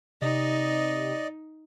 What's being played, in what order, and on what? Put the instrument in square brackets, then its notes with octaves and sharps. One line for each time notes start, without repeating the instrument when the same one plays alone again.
[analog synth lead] C3 [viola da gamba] D#4 [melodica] D5 D#5